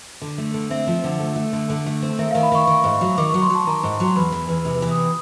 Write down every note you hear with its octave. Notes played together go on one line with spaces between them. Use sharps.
D3
A3
D3
C4 E5
F3
D3
A3
A3
D3
D3
A3
C4
D#3 E5
D#3 F5
B5
D#3 C#6
D#3
G#2
F#3
D#3 D6
C#6
F#3
C6
F#3
A5
D#3 A#5
G#2
F#3 C6
E2 B5
E3
E2
C3
E3
D#6